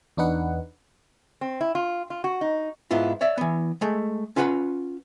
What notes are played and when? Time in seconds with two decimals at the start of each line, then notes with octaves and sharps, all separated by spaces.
0.17 E2 D4 D#4 B4 F#5
1.41 C4
1.61 E4
1.75 F4
2.10 F4
2.24 F#4
2.41 D#4
2.91 G#2 B3 E4 F4
3.21 C#5 D5 E5
3.37 E3 B3
3.81 G#3 A3
4.36 C#4 F4 B4 F#5 G#5 B5